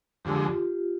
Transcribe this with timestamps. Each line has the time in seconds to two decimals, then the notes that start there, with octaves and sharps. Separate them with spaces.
0.25 F2 D3 G#3 G4
0.35 G4
0.45 F4